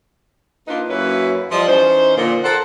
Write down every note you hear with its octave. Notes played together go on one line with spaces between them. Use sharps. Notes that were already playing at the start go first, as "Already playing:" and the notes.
A#3 D4 D#4 F4 B4
F#2 A#3 C#4 E4 F#4 B4
F3 G3 D#5
E3 C#4 D#4 C5
A#2 D3 F3
A4 A#4 C5 F#5